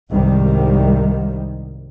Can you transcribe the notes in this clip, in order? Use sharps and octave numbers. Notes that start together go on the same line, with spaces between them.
C2 G#2 D#3 G3